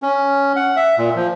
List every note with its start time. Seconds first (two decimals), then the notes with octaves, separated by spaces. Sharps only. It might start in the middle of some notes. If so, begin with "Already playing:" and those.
0.03 C#4
0.56 F#5
0.76 E5
0.98 A#2
1.16 F3